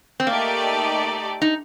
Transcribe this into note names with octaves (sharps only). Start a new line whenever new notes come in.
C4
A3 A#3 D#4 G4 D5
D#4